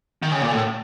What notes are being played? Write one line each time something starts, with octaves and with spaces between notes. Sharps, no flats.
D#3
C#3
A#2
A2